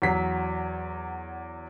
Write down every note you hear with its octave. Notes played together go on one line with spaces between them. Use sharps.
E2 F#3 B6